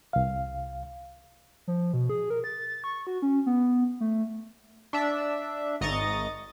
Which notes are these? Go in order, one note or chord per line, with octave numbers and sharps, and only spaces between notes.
C2 F5
F3
B2
G#4
A#4
A6
C#6
F#4
C#4
B3
A3
D4 E5
G#1 D#5 A#5 C#6 A6